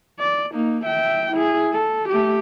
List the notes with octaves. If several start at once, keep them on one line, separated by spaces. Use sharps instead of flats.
D5
A#3 D#4
E5 G5
E4 G#4
A4
A3 G4